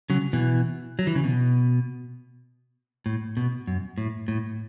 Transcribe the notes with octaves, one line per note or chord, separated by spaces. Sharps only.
C#3 F#3
B2 E3
F#3
E3
C#3
B2
A2
B2
F#2
A2
A2